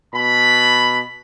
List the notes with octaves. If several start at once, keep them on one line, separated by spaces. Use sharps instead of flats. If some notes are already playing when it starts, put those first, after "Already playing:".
B2 B5